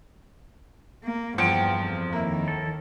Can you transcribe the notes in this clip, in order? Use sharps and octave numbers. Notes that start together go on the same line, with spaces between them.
A#3
E2 G2 F3 F#5 G5
F2
D#2 D#3 A#3 E4
A4